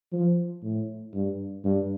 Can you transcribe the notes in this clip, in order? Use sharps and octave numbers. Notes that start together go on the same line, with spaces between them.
F3
A2
G2
G2